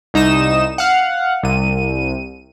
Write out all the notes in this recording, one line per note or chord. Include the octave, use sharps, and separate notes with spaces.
C2 D#4 D#6 E7
F5 F#5
C2 D#7